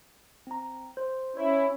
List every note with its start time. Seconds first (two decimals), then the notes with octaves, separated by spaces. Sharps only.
0.47 C4 A#5
0.97 C5
1.37 C#4 E4 C#5